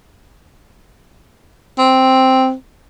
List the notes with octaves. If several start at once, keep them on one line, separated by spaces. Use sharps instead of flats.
C4